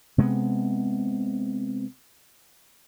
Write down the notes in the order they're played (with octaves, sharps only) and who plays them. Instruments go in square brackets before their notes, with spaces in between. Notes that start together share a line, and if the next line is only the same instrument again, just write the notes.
[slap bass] C3 G#3 A3 B3